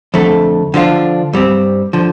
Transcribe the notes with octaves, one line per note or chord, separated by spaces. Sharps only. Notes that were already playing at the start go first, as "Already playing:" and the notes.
F2 D3 A3
D3 F3 D4 F4
G2 G3 C4
D3 F3